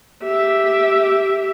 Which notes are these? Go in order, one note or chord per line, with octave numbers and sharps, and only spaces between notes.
G4 E5